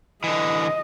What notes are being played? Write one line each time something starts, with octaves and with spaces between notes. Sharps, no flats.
D3 E3 D#5